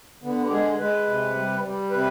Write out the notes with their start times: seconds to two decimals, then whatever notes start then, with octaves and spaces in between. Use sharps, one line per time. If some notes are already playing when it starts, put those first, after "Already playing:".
0.23 D3 B3
0.47 G4
0.52 G#3 G#4
0.79 G#3 B4
1.07 C3
1.35 G3
1.63 G3
1.91 C3 B4